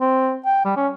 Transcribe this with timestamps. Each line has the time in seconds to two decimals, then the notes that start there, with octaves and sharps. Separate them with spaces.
0.01 C4
0.45 G5
0.65 G3
0.76 C#4